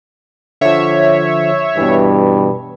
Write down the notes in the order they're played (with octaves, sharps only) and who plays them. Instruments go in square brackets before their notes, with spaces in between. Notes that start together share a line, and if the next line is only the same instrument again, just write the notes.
[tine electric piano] D3 F3 [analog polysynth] C#5 E5
[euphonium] G2 [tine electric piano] B2 E3